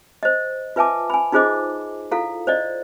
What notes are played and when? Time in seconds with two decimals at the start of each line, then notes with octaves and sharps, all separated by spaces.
0.23 C5 D#5
0.76 F4 B4 E5 G#5 A5 D6
1.10 G#5 B5
1.32 D#4 F4 G#4 C5 D#5 D6
2.11 E4 F4 A4 F5
2.47 C5 D5 D#5